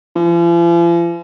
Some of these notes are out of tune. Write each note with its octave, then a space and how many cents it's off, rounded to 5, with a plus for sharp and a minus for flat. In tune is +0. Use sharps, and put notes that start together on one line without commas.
F3 -45